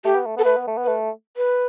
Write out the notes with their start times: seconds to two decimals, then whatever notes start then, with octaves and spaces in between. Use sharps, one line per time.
0.05 A3 G4
0.15 B3
0.26 A3
0.36 B3 A4
0.44 A3 B4
0.57 B3
0.67 A3
0.77 B3
0.84 B4
0.88 A3
1.37 B4